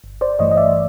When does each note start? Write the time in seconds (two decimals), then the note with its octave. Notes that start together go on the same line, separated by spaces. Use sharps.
0.04 G1
0.21 C5 D5
0.39 G2 E3 A3 C#5 D#5
0.51 D#5
0.57 D5 E5